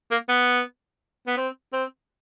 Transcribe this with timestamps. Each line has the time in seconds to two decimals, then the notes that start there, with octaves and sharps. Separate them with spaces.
0.11 A#3
0.29 B3
1.27 B3
1.37 C4
1.73 C4